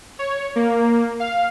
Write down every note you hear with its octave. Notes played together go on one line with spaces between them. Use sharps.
C#5
A#3
F5